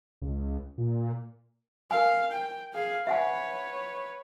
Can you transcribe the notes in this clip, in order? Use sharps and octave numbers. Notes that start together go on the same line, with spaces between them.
C#2
A#2
A#4 F5 G#5
G5
G#4 F5
B4 C#5 E5 F#5 G#5